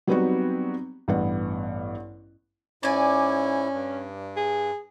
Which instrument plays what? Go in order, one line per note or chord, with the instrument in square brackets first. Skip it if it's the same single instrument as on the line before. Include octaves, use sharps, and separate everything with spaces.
[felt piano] F#3 G3 B3 C4 D#4 F#4
A1 G2 B3 F#5
[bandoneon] G#2 E4 [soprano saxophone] C#4 [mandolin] D5 G#5
[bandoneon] G2
[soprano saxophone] G#4